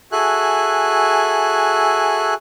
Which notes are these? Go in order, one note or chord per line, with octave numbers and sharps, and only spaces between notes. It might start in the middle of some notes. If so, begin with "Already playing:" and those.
F#4 G#4 A4 E5 G#5 F#6